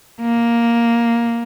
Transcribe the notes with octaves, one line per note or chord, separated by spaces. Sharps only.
A#3